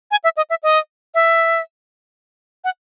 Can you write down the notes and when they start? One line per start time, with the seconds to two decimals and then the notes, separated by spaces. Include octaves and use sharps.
0.11 G#5
0.24 E5
0.37 D#5
0.50 E5
0.63 D#5
1.14 E5
2.64 F#5